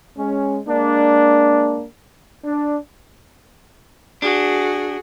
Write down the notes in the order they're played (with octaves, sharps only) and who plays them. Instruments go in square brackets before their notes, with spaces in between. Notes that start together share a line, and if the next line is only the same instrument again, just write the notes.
[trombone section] G#3 C#4
G#3 A#3 D4
D4
[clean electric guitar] D4 [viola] F#4 G#4